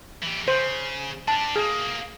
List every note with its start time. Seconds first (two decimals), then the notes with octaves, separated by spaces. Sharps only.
0.23 E3 G4
0.48 C#3 C5
1.28 D4 G4 A5
1.56 B1 A#3 G#4